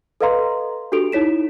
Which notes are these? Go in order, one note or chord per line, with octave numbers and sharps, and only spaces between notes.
A4 B4 D#5 F5 A#5 C6
D4 F#4 G4 A4 D7 F7
D#4 E4 C#5 B6 E7